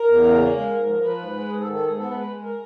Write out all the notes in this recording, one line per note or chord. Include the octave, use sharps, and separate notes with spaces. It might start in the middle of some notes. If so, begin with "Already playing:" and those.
Already playing: A#4
E2
C#3
A#3
G#3
G#2
F3
F3 B4
G#2
G#3
G#2 G#4
A4
D#3
A4
G#2 G#4
B3 A4
B4
G#3
B4
G#3
A#4